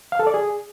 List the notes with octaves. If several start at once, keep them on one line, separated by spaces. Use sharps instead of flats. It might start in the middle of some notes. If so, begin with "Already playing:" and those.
F5
A4
D5
G#4